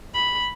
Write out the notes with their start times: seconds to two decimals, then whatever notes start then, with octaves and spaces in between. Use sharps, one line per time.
0.14 B5